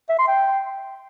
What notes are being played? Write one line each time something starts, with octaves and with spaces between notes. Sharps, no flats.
E5
C6
G5